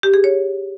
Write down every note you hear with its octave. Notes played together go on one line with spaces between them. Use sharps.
G4
G#4
C#5